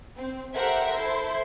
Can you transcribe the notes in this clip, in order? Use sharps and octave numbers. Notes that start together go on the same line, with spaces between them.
C4
G4 A4 A#4 C5 E5 F#5
E4 A4 C5 C6